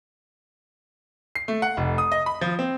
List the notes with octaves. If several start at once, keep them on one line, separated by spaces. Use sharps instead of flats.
C7
A3
F#5
F1
D#6
D#5
B5
F3
C4